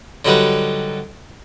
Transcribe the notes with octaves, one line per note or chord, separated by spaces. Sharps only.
D3 F#3 G3 D#4 G4 B4